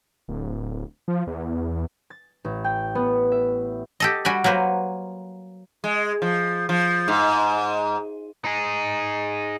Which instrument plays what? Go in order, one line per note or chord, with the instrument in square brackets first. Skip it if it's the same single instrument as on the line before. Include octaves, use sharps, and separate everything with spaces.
[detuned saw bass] D1
F3
E2
[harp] A6
A1
G5
B3
E5
[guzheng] G4 A4 D#5
G3 F#4 G#5 B5
F#3 A#3 B4 C5
[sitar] G#3
F3
F3
G#2
[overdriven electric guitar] D#4 G#4